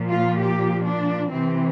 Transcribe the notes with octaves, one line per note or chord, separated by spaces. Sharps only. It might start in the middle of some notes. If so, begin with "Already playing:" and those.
Already playing: A#2 F3
F4
G4
D4
C3 E3 C4